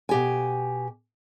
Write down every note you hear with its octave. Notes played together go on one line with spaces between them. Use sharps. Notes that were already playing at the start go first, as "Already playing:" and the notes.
B2 G4 G#5